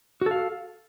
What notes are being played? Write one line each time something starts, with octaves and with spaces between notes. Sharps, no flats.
F#4 A4 F5